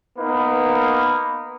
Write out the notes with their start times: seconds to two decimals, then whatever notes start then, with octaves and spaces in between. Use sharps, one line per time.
0.18 A#3 B3 D#4 B4